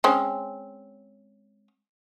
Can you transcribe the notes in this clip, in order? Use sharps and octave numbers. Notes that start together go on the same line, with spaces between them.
G#3 C4 C#4